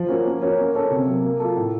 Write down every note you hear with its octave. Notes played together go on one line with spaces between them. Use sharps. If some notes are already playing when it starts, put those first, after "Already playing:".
Already playing: F3
A#3 C#4 F#4
A#3
C#4 F#4 A#4 C#5
A#3
C#4 A4 C#5
C3
F#3 A#3
A#3
F4 A4
A2